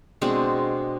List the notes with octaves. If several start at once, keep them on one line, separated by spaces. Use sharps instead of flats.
B2 G#3 C4 D4